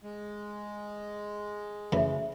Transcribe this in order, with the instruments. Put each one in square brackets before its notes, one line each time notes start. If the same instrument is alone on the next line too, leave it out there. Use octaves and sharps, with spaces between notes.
[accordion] G#3
[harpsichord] F#2 E3 A3 [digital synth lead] C#3 [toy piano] E5 B5